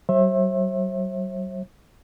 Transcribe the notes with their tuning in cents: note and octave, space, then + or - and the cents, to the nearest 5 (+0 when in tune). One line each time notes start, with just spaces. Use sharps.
F#3 +45 C5 +45 E5 +0